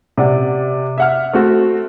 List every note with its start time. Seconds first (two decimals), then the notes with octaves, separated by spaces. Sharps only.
0.17 C3 D5 F#5
0.98 E5 F#5 F6
1.33 A3 C4 F#4